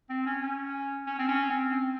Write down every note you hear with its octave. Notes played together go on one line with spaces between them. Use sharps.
C4
C#4
C#4
C#4
C4
C#4
C4
C4